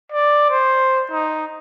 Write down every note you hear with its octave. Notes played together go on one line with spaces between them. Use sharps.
D5
C5
D#4